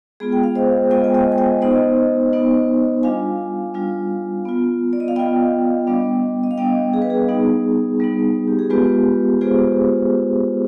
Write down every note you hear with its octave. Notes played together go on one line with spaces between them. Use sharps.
G#3 B3 F4 G#4
G5
F5
C5 D#5
G#3 B3 F4 D#5 G5
G#5
D#5 G5
G#5
D#5 G5
B3 D#4 C5 D#5
B3 D#4
G3 D4 F4 F5 G#5
G3 D4 F4
B3 F4
D5
D#5
F5
B3 F4 D#5 G5
G3 B3 D4
D#5
F5
G3 B3 D4 D#5 G5
G#4
B4
G#4
G3 B3 D#4 G#4
G3 B3 D#4
G4
G#4
G#3 B3 F4 G4 B4
G#3 B3 F4 G#4 C5